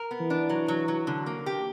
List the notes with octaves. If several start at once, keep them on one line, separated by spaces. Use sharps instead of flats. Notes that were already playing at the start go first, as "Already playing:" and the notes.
Already playing: A#4
B3
E3
D4
F#3
F#3
F#3
D3
A#3
G4